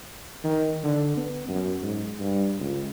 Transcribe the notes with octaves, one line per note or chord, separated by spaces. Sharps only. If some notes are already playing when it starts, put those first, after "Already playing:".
D#3
D3
B3
F#2
G#2
G2
C#2